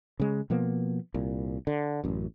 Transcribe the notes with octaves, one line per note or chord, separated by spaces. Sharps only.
C#3 G#3
B2 F3 A#3 B3
C2 A#2
D3
A1 F#2